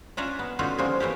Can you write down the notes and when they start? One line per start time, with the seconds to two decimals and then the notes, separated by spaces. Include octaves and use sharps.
0.17 C#4 D4 F4 D5 E5 A#5
0.39 B3
0.59 D3 A3 C#4 D#4 F4 F#4
0.78 C#3 F3 G3 G#3 A#3 C4
1.00 E3 A3 A#3 G4